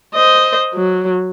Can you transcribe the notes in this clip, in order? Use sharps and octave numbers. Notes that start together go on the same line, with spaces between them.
C5 D#5
F#3